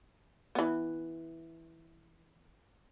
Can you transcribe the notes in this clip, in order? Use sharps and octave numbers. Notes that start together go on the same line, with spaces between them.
E3 B3